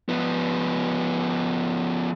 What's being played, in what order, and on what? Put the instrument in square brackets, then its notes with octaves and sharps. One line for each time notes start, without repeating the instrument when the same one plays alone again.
[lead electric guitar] F3 B3